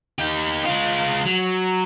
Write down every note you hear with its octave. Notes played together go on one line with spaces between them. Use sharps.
D#4 G4
G#3 F4
F#3